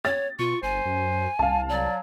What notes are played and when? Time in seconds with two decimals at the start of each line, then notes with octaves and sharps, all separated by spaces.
0.05 C#5 A6
0.39 B2 F4 C#6
0.63 G1 C5 G#5
0.86 F#2
1.39 C2 F5 A5
1.69 F#3 D5